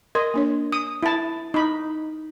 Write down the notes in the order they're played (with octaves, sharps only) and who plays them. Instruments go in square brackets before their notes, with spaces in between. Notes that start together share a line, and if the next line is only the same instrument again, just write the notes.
[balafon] A#4 C6 [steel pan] D#5
[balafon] A#3 D4 C#5
[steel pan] D#6
E4 A5
D#4 B5